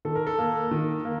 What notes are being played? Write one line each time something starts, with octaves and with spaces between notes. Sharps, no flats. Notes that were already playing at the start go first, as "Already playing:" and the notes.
D#3 A4
A#4
A4
A#3
D#3
A#3